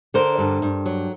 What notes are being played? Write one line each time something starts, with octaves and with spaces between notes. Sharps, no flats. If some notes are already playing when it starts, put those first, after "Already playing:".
D3 A#4 C5
G2
G2
F#3